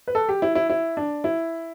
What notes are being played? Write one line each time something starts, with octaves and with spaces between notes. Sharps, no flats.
B4
A4
G4
E4
E4
E4
D4
E4